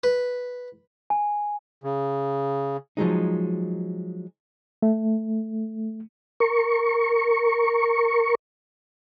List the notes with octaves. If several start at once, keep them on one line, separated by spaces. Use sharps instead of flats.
B4
G#5
C#3
F3 F#3 G#3 D#4
A3
A#4 C#6